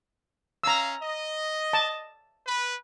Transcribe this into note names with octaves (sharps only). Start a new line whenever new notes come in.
C#4 F5 A#5 E6
D#5
A5
B4